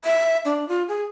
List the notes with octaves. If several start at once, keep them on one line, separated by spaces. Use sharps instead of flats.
E5
D4
F4
G#4